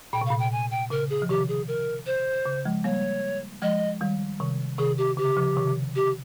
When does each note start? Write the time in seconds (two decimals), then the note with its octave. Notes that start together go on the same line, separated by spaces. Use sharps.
0.13 A#2 G5
0.21 C3
0.26 F5
0.30 A#2
0.39 G5
0.52 G#5
0.71 G5
0.90 C#3 A#4
1.10 G#4
1.22 F3
1.29 C3 D#3 G4
1.49 G#4
1.68 A#4
2.06 C5
2.46 C#3
2.65 F3 G#3
2.84 G3 A#3 C#5
3.62 F3 G#3 D#5
4.01 D#3 G3
4.40 C3 D#3
4.78 C3 D#3 G#4
4.98 G4
5.17 C#3 G4
5.37 C#3 F3
5.56 C3 D#3
5.96 G4